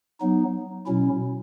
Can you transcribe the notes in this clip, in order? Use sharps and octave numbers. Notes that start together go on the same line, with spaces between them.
F#3 B3 D#4
B2 F#3 C#4 E4